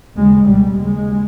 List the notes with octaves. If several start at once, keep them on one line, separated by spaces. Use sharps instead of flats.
D#2 C#3 G#3
C#2 B2 G3
D#2 C#3 G#3